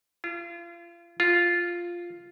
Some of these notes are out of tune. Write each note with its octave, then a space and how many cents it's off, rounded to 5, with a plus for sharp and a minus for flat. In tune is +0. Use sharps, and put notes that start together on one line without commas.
F4 -35
F4 -5